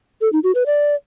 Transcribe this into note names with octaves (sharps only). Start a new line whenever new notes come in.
A4
D#4
F#4
B4
D5